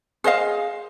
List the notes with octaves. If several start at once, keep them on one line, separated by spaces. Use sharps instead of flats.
G#4 C5 D#5 F5